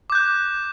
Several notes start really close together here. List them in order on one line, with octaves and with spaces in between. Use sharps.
D6 G6 F#6